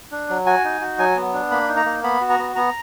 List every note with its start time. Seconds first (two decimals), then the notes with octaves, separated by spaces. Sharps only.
0.11 D4
0.29 F#3
0.46 F#4 G#5
0.64 D#4
0.81 F#4
0.98 F#3 G#5
1.16 B3
1.33 D4
1.51 A#3 B5
1.68 D#4
1.77 A#5
1.85 A#3
2.03 B3 B5
2.21 F#4
2.30 A#5
2.39 B3
2.56 B3 A#5